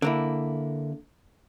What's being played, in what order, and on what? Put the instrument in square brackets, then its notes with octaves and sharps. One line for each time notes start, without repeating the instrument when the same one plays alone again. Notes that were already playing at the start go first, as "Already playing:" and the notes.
[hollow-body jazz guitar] D3 A#3 E4